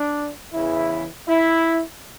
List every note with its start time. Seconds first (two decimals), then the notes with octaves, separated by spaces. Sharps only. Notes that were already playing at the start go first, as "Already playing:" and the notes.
Already playing: D4
0.53 E2 C#3 E3 E4
1.28 E4